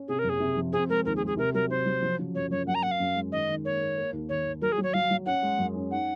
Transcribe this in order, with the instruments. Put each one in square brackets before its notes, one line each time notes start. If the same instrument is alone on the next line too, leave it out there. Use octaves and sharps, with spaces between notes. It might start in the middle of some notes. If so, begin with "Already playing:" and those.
Already playing: [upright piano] C#4
[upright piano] C3 [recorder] G#4
[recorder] A#4
[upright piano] F#1
[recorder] G#4
[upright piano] C3
F3
[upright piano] C4 [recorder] G#4
[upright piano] G#3 [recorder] A#4
[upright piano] D#2 [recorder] A#4
[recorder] G#4
[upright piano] G#3
[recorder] G#4
[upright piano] C3 [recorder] A#4
[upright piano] F#3 [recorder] A#4
[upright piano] C3 [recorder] C5
[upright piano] F#3
F3
C#3
[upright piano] F#2 [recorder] C#5
[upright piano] F#2 [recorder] C#5
[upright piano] F#2 [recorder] F#5
[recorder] A#5
[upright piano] F#2 [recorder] F#5
[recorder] F5
[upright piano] F#2
G#3
[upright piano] D#3 [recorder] D#5
[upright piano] D#3
[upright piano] A#3 [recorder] C#5
[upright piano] A#3
A#3
D#2
[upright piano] D#3 [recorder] C#5
[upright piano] D#3
[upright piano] F#3 [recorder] A#4
[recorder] G#4
[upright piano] F#3
[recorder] C#5
[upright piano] F#3 [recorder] F5
[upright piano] F#3
[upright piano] C#4 [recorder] F#5
[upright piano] G#3
F#2
C#4
[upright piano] D#4 [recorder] F#5